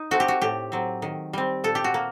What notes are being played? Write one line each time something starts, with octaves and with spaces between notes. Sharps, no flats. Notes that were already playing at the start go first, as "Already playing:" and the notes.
Already playing: D#4
A3 C4 F#4
G4
F#4
A2 G4
F#3 C4
D#3
G3 C4
A#2 A4
G4
F#4
A#3